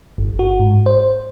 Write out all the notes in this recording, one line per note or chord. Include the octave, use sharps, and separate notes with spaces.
G1
F#4
G#2
C5